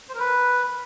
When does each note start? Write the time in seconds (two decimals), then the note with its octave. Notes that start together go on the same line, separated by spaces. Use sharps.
0.09 C5
0.14 A#4
0.19 B4